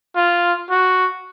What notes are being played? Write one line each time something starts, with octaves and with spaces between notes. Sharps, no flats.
F4
F#4